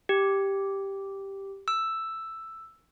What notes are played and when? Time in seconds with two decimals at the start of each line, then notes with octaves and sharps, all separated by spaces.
0.09 G4
1.68 E6